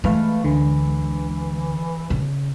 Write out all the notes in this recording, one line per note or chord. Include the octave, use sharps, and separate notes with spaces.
E3 G#3 A3 B4 F5
D2 D3 E3
C#3